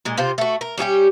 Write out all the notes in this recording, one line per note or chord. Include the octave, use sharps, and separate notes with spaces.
A#2 G#3
C3 F4 C5
A3 F#4
A#4
G3 C#4 F#4 G4